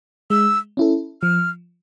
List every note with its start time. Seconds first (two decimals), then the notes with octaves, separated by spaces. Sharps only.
0.30 G#3 E6
0.77 C#4 E4 A4
1.22 F3 F6